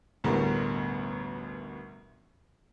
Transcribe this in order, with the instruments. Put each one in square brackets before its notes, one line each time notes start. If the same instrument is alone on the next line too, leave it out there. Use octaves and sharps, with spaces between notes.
[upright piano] A1 D2 B2 G3 A3 A#4